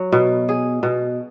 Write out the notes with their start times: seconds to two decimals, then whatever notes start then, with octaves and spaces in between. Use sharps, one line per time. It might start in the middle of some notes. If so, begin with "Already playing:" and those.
Already playing: F#3
0.12 B2
0.49 G#4
0.83 B2